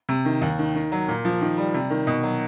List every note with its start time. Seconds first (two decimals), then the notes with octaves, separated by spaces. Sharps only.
0.09 C3
0.25 D#3
0.42 D#2
0.59 D#3
0.75 D#3
0.92 F#3
1.08 A#2
1.25 F3
1.41 D#3
1.57 G3
1.74 C3
1.90 D#3
2.07 B2
2.23 F#3